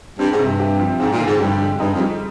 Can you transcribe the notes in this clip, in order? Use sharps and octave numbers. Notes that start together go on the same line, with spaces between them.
G2 C4
G#2
C3
G2
G4
F3
G#2 C4
A#2
D3
G#2
G2 G4
G#3
G2 D#4
F2
G3